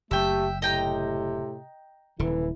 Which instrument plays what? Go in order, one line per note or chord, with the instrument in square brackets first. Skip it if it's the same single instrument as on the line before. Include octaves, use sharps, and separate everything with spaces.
[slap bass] F#1 [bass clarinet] A3 [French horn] G4 [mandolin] E5 G5
[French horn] A2 [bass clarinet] C3 [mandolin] D#5 G5 A#5
[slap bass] D#1 D3 [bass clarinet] E3 [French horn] E4